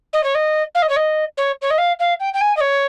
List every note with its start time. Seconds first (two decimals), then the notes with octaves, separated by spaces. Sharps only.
0.13 D#5
0.23 C#5
0.35 D#5
0.75 F5
0.82 D#5
0.89 C#5
0.96 D#5
1.37 C#5
1.62 C#5
1.70 D#5
1.78 F5
1.99 F5
2.20 G5
2.34 G5
2.41 G#5
2.57 D#5
2.60 C#5